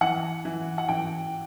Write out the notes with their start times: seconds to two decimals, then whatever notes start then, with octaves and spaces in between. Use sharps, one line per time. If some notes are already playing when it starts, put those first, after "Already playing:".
0.01 E3 F#5
0.45 E3
0.78 F#5
0.89 E3 G5